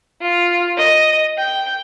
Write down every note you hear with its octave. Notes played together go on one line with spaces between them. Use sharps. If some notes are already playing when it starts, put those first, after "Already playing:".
F4
D#5
G5